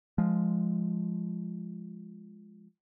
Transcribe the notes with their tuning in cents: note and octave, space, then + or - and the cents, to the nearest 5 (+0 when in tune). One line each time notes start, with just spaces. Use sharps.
F3 +0 G#3 +0